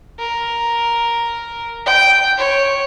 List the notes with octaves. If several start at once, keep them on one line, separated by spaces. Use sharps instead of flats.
A#4
G5
C#5